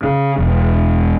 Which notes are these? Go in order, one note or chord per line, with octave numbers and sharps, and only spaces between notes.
C#3
E1